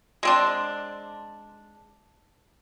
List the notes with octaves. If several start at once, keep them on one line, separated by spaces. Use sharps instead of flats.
G#3 C4 D4